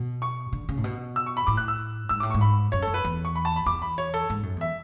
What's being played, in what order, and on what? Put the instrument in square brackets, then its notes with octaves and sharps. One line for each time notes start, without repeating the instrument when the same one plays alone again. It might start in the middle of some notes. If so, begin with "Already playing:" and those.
Already playing: [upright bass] B2
[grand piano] C#6
[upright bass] D3
C#3
A2
B2
[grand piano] E6
C#6
B5
[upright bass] A2 [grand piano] D6
[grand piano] F#6
E6
[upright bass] G#2 [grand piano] E6
[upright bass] A2 [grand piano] D6
[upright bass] G#2 [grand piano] C#6
[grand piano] B5
[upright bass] F#2 [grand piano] C#5
[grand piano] A4
[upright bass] F#2
[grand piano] B4
[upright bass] E2
[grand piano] C#6
B5
A5
B5
[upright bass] E2 [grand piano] D6
[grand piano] B5
C#5
A4
[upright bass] G#2
F#2
[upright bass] E2 [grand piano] E5